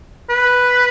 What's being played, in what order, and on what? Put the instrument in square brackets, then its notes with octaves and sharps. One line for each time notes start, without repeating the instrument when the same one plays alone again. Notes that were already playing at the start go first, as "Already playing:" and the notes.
[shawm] B4